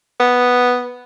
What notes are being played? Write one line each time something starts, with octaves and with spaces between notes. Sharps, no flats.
B3